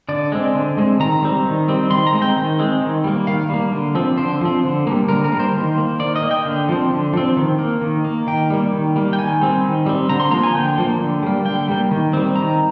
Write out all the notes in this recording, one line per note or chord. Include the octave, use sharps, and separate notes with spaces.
D3 D5
G#3 C4
D3
G#3 C4
D#3 A#5
G3 C4
D#3
G3 C4
D#3 C6
A#5
G#3 C4
G5
D#3
G#3 C4
D#3
G3 A#3
D#3 F5
G3 A#3
D3
F3 C4
D3 C5
F3 C4
D3
G3 A#3
D3 A#4
A#4
G3 A#3
C5
D#3
A#3
D#3 D5
D#5
A#3
G5
D3
F3 C4
D3
F3 C4
D#3
A#3
D#3
A#3
D#3 G5
G3 A#3
D#3
G3 A#3
G5
D#3 G#5
G3 C4
D#3
G3 C4
D3 A#5
C6
F3 A#3 A#5
G#5
D3 G5
F3 A#3
D3
G3 A#3
D3 G5
G3 A#3
D#3
G3 C4
D#3 A#5